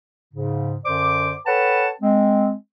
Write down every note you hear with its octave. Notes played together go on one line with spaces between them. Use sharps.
G#2 C#3
F#2 D3 C5 D5 D6
A4 B4 C#5 F#5 G5 A5
G#3 C4